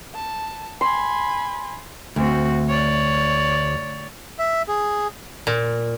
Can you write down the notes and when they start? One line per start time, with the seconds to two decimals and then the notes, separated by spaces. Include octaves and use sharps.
0.15 A5
0.81 G#5 B5 C6
2.16 D2 C4 F#4
2.68 C#5 D5
4.39 E5
4.68 G#4
5.47 A#2